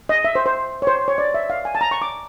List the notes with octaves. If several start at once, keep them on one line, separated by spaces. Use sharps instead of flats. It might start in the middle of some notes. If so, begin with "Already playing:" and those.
D#5
E5
C5
C5
C#5
C5
C#5
D5
E5
F5
G#5
A5
A#5
C#6
D6